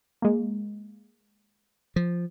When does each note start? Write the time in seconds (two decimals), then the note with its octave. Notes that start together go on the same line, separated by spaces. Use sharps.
0.22 G#3 A#3
1.96 F3